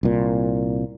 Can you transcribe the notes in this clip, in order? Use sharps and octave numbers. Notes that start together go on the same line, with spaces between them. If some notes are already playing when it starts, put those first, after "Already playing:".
C2 A#2